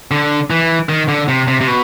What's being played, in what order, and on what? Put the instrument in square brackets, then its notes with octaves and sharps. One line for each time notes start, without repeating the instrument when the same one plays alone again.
[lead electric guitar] D3
E3
D#3
D3
C3
C3
C3
B2